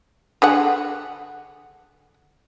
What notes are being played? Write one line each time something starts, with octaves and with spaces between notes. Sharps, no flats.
D3 G#4 F#5